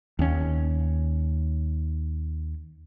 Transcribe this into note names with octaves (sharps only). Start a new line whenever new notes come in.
D#2 C#4